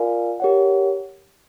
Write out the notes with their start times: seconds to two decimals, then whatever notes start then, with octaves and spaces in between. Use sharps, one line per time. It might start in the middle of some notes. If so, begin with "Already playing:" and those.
Already playing: F4 A#4 D5 F5 G#5
0.40 G4 A#4 C#5 F#5